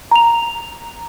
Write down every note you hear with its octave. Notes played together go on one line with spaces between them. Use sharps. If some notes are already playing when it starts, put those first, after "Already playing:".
A#5 F7